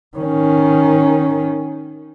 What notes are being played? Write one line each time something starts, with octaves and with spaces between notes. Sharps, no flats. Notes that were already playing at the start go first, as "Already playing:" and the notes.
D#3 C#4